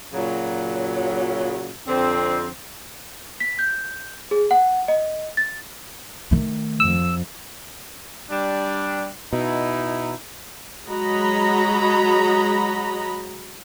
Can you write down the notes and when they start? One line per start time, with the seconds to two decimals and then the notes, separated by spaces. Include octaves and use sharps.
0.13 A#2 C#3 F#3
1.88 F2 D3 C4
3.40 B6
3.59 G6
4.31 G#4
4.51 F#5
4.88 D#5
5.37 A6
6.31 D#3 A3
6.80 F2 E6
8.30 G3 D4
9.33 B2 D#4 E4
10.88 F#3 G#3 F#4 D#5 A#5 B5